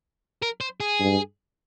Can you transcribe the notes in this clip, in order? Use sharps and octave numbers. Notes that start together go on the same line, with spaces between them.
A#4
C5
G#4
G2